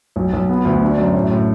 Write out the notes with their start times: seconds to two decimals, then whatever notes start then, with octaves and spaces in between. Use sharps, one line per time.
0.16 B1
0.33 B1
0.49 B3
0.65 D2
0.82 D4
0.98 F#2
1.14 A2
1.31 A2